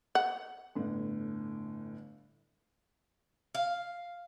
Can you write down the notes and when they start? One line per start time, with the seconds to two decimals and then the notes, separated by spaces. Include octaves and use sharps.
0.15 F#5
0.75 G1 A2
3.55 F5